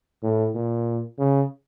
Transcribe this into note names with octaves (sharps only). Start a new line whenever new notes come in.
A2
A#2
C#3